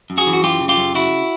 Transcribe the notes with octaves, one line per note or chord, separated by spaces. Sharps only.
F#2
F#4 G#4
E3
F#4
F#2 F4 G4
C#3
F4 G4
F#2
C#3 E4 F#4